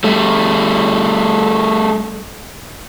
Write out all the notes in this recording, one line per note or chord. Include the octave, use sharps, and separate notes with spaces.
G3 A3